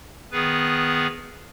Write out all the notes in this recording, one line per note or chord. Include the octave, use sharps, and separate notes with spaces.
D#3 B3 G#4 B4